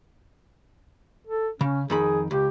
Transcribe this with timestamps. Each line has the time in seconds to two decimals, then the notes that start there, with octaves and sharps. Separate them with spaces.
1.27 A4
1.61 C#3 C#4
1.90 F2 D#3 G#4 B5
2.31 C#2 G4